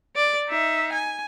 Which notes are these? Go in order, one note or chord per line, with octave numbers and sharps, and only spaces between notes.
D5
D#4 E5
G#5